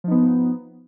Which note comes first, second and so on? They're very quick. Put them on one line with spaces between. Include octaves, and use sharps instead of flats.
F3 D#4 B3